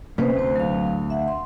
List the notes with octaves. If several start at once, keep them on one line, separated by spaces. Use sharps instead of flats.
C3 A#3 C#4 B4 C5
D2 C4 C5
F#3 F5
E5 F#5
C6